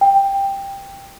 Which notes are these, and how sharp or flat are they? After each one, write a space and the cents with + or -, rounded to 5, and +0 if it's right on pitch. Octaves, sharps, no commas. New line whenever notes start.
G5 +10